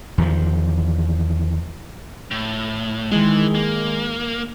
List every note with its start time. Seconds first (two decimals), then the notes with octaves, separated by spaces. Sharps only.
0.18 E2 D#3 F3
2.31 A2
3.12 D#3 E3 G#3
3.55 A#3